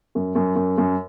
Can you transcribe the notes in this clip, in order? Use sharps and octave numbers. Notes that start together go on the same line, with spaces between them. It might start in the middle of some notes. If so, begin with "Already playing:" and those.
F#2
F#2
F#2
F#2